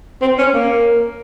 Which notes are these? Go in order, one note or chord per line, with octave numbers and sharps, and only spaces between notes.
C4
C#4
A#3